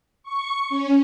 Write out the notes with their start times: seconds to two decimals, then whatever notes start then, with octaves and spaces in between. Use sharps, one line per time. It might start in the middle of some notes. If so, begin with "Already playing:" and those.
0.23 C#6
0.69 C#4